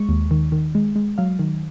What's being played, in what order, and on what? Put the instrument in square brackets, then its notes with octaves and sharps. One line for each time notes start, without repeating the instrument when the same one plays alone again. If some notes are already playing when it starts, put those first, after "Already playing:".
Already playing: [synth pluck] G#3 C#6
D#2
D#3
D#3
G#3
G#3
F#3 F5
D#3